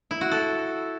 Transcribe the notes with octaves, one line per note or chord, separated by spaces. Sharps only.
E4
F#4
A4